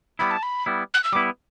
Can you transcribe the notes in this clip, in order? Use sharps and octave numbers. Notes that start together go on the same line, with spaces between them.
G3 B3 E4 B5
A5
B5
G3 B3 E4
F#6
E6
G3 B3 E4 D6